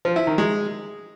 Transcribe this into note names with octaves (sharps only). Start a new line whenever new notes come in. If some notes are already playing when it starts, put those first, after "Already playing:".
F3
E4
D#3
G#3